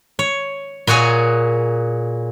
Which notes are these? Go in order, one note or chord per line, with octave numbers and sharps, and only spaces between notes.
C#5
A#2 F#4 G#4 C#5 G#5